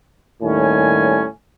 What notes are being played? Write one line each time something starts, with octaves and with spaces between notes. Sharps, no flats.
D#2 A2 G3 C#4 G#5